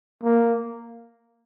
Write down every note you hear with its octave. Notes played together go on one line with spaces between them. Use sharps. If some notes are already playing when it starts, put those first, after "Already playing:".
A#3